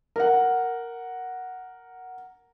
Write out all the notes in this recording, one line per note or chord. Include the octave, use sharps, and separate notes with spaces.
A#4 F#5